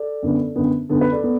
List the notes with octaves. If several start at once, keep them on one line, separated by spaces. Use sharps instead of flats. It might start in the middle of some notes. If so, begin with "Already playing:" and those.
Already playing: A4 D5
F#2 D3 B3
F#2 D3 B3
F#2 D3 B3 A4
B4
A4 D5
B3